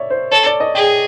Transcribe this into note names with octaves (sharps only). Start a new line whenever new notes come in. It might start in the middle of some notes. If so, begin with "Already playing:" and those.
Already playing: C#5 D5 E5
C5
A4 C#5
D5
D#5
G#4 G5